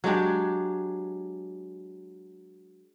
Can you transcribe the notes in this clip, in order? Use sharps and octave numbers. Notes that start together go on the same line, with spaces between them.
F#3 G#3 D4 G4